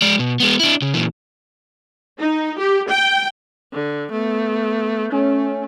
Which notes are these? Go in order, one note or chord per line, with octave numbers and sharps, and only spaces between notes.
G#3 D5
B2
G#3 B3
D4 E4
C#3
A#2 E3
D#4
G4
G5
D3
A3 B3
A3 C#4